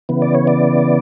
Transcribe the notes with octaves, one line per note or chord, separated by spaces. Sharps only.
C#3 E3 B3
D5
C#5
D5